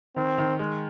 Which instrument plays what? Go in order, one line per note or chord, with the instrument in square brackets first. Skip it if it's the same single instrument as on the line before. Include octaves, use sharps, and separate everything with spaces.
[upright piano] D#3 [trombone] C4
[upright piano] D#3
G#3